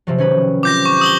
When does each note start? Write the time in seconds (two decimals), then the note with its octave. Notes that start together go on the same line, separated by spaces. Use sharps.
0.07 C3 F3 F#3
0.18 D#3 C#4 B4
0.63 C4 F4 G4 D6 G6 A#6
0.86 C#6
1.01 D#6 F#7 G7